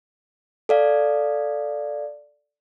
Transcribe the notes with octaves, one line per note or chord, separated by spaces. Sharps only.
A4 D5 F5